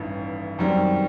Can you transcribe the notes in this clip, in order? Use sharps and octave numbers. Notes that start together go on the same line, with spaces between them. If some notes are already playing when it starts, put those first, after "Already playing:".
Already playing: A1 G2 D#3
F#2 D#3 G3 C4